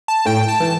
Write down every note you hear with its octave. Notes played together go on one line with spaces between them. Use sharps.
A5
A2 G5
A5
E3